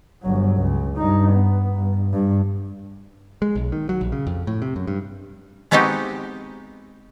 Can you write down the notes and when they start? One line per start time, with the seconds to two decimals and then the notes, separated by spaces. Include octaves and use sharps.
0.23 G1 F#3
0.57 C#2
0.97 G2 D#4
1.32 B3
1.76 G2
2.13 G2
3.42 G#3
3.55 B1
3.72 D#3
3.89 F#3
4.01 A#1
4.12 C#3
4.27 F2
4.47 A2
4.62 C3
4.76 F#2
4.87 G2
5.71 G#3 B3 C4 D#4 F#4 G4